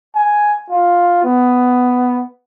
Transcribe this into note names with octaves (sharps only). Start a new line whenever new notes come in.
G#5
F4
B3